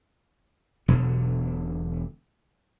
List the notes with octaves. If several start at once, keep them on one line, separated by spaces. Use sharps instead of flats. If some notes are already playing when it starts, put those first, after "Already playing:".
E1 B2 D3 F#3